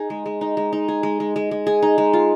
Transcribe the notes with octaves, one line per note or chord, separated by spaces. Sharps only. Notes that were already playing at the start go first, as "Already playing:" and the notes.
Already playing: D#4 G#4
G#3
G#3
D#4
G#3
D#4
G#4
G#3
G#3
G#3
G#3
G#4
D#4
G#3
F4